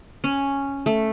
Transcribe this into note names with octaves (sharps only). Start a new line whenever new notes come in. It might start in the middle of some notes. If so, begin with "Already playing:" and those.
C#4
A3